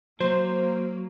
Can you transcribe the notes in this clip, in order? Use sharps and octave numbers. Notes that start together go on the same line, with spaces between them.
F#3 A#3 C5